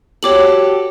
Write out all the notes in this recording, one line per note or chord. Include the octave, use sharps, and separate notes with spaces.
F#4 G4 A4 C#5 D6 F#7